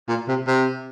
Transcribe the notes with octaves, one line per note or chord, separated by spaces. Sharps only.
A#2
C3
C3